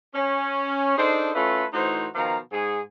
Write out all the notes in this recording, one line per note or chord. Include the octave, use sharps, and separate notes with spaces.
C#4
D4 D#4 G#4 A4 C5
A3 C#4 E4 F4 A4 B4
A2 E3 D#4 F#4 C5
B2 D#3 F3 F5 A#5
G#2 G#4